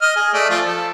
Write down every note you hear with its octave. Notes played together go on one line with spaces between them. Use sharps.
D#5 F6
G#4
A3 D5
F3 F4
A4